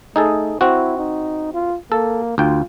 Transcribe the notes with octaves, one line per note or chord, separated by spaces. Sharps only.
A3 D#4 G#4 A4
C4 E4 F#4
D#4
F4
A#3 A4
D2 F4 G5